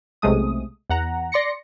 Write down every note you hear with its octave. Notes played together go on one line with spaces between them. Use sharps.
B1 C3 G#3 A3 D#6
E2 F#5 A#5
D5 C6 A#6 C#7